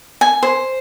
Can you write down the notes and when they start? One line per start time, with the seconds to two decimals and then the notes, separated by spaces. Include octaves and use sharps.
0.21 G#5
0.43 C5